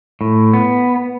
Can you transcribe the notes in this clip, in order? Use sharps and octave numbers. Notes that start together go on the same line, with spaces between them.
A2
B3